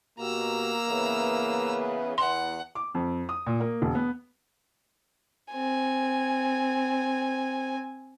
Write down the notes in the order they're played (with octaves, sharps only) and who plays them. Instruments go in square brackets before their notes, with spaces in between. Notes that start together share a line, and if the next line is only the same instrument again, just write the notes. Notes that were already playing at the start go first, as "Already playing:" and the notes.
[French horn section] B2 F#4 G4 [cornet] A#3 [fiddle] A#5 E6
[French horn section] C#3 E3 B3
[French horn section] E2 [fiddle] F#5 [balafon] C6
[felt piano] D6
F2
D#6
A#2
A#3
E1
B3
[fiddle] C4 G#5